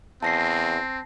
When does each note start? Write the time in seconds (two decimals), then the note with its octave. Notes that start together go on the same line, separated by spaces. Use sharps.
0.23 E2 C4 A5 A#6 C7